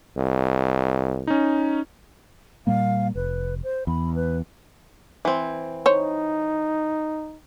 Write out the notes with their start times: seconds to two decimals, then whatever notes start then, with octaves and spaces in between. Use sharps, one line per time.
0.18 C2
1.27 C#4 D#4
2.67 A#2 G3 A#3 F5
3.15 F1 B4
3.63 C5
3.87 E2 B5
4.15 B4
5.25 E3 C4
5.86 D#4 C5 C#5